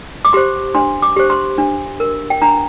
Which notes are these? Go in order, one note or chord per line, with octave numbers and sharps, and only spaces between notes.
D6
G4 C5 C6
D4 C6
D6
G4 C5
C6
D4
A#4
G5
D4 A#5